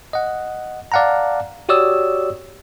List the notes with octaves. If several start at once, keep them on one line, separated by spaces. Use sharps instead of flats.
D#5 F#5
D5 F5 F#5 A5 A#5
F#4 G4 C#5 D5 D#6 E6